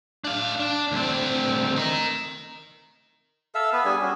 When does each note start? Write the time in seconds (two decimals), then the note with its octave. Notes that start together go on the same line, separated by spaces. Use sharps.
0.24 D4 F5
0.59 D4
0.92 D2 C4
1.76 A#4 D#5
3.55 A4 E5 F5 E6
3.73 B3 B4
3.85 G3 D4 G#4 G#5
4.01 C#4 F#4